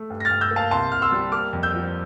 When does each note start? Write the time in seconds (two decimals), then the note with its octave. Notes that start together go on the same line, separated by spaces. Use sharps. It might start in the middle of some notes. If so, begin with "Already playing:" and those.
Already playing: A3
0.10 G2
0.20 A#6
0.25 F6 A6
0.31 G2
0.41 E6 G6
0.51 A#3
0.56 F5 A5
0.71 C2 A5 C6
0.92 C2 F6
1.02 C6 E6
1.12 G3
1.32 A#3 D6 F6
1.53 F2
1.63 E6 G6
1.73 F3